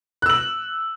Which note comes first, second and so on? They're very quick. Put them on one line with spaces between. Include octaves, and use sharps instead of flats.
F#6 E6 F#7